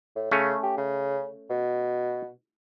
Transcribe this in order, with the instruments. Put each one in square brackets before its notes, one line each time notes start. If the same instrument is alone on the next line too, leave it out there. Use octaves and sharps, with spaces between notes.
[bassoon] A2
[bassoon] C#3 [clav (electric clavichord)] A3 C#4
[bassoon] G4
C#3
B2